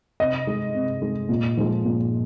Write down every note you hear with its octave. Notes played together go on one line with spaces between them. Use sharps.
C3 D#5
G#3
C3
G#3
A#2
F3 G#3
A#2